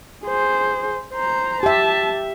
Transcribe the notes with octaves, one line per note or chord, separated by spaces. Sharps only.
G#4 C5
C5 A#5
G4 E5 A5